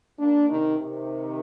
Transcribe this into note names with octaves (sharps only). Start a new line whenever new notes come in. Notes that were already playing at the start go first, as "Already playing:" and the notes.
A#3 D4
C3 D#3
C3 D#3